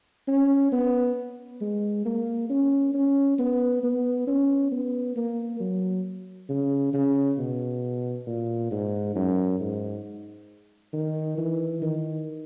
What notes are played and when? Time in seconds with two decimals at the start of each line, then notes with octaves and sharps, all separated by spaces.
0.28 C#4
0.72 B3
1.61 G#3
2.06 A#3
2.50 C#4
2.94 C#4
3.39 B3
3.83 B3
4.28 C#4
4.72 B3
5.16 A#3
5.60 F#3
6.49 C#3
6.93 C#3
7.38 B2
8.27 A#2
8.71 G#2
9.16 F#2
9.60 G#2
10.93 D#3
11.38 E3
11.82 D#3